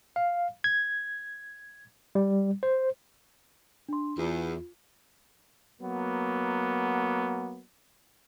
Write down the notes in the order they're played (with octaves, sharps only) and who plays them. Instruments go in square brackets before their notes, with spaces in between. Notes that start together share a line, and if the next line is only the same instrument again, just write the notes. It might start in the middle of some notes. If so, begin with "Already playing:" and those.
[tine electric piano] F5
G#6
G3
C5
[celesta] D4 C6
[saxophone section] E2 [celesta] F4
[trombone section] F#3 A#3 B3